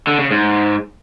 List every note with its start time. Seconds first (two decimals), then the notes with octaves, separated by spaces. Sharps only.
0.07 D3
0.19 C#3
0.31 G#2